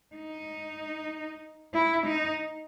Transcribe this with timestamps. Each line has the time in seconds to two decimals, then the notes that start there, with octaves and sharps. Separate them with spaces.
0.16 D#4
1.74 E4
2.06 D#4